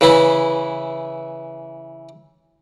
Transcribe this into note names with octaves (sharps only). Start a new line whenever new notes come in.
C#3 E3 E4